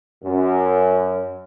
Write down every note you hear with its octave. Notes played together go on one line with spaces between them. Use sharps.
F#2